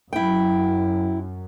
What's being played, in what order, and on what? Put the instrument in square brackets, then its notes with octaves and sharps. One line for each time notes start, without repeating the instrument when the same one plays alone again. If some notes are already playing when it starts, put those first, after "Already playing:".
[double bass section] F#2 [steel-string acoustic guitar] E4 G5